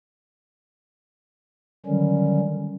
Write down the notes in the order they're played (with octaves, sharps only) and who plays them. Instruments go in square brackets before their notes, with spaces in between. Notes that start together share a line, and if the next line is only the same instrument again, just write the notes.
[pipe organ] D3 D#3 F#3 G3 C#4